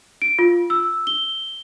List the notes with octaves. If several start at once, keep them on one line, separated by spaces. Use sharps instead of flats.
D7
F4
E6
G7